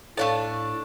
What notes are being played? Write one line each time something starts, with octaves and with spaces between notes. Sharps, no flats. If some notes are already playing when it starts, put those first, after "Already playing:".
A2 A3 D4 A4 C#5 F5 A5